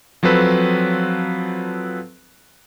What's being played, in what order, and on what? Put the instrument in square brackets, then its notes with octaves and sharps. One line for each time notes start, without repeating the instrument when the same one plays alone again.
[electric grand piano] F3 F#3 C4 A4 B4